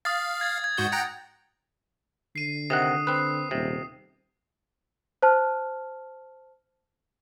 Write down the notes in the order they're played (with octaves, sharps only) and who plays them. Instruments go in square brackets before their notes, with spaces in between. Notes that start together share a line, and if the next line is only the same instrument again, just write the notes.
[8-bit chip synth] F5 [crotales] D#6 A6
[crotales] G#6 A6
G#6
[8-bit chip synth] G#2 F#4 G6
F#5 G5 A#5
[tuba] D3 [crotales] C7 D#7
[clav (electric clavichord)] C3 D#3 F#5 [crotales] D#6
[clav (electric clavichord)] C4 B4 [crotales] D#6 C7
[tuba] D#1 [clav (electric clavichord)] C3
[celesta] C5 A5 F6